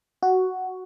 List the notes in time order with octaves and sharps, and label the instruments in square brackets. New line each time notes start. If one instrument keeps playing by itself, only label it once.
[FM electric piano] F#4